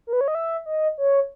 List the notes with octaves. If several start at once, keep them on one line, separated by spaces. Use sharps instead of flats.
A#4
B4
C#5
D#5
E5
D#5
C#5